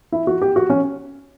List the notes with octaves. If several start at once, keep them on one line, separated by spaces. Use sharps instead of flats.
E4
F#4
G4
F#4
C#4